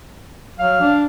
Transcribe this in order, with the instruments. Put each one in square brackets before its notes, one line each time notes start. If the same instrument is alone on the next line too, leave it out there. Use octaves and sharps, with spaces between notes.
[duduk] F#3 [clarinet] F5
[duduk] D4